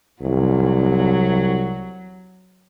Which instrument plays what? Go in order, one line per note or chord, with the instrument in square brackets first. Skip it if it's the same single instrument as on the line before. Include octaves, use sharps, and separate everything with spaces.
[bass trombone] C2 [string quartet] F#3